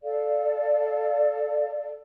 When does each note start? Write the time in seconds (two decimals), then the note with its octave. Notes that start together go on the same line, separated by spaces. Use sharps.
0.03 A4 D5 F5